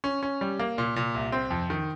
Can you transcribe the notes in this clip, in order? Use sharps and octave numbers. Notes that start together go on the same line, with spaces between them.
C#4
C#4
G3
A#3
A#2
A#2
C2
C4
F2
D#3